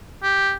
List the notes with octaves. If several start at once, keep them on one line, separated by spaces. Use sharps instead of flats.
G4